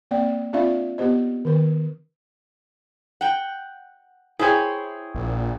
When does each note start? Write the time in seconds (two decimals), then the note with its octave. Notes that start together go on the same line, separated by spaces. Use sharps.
0.11 A#3 C4 D5 G5
0.53 C4 D4 F4 D5 E5 F5
0.98 B3 G4 C5 D#5
1.45 D#3 B4
3.21 F#5 G5
4.39 E4 G#4 C5 C#5 G5 G#5
5.15 A#1